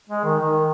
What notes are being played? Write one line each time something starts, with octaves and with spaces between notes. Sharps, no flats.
G#3
D#3
D#3